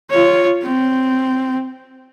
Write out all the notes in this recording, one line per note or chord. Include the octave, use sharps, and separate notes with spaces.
F4 C#5
C4